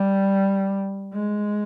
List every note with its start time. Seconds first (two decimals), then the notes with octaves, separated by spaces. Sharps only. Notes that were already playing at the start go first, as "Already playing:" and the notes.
Already playing: G3
1.13 G#3